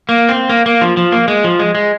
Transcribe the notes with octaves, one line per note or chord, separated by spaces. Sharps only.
A#3
C4
A#3
A#3
F3
F3
A#3
G#3
F3
G#3
G#3